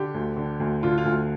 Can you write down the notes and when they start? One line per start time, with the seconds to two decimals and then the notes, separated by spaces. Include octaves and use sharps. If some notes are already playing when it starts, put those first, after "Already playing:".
Already playing: D3 G4
0.14 D2
0.37 D3
0.60 D2
0.83 D3 F4
0.98 F4
1.05 D2